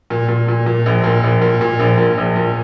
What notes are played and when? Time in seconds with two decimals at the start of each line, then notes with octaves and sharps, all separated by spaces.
0.10 A#2
0.29 A#2
0.48 A#2
0.66 A#2
0.86 A#1
1.04 A#2
1.23 A#1
1.41 A#2
1.61 A#2
1.79 A#1
1.98 A#2
2.18 A#1
2.36 A#2